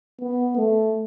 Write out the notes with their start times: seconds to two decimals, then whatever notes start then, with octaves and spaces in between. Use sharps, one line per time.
0.21 B3
0.57 A3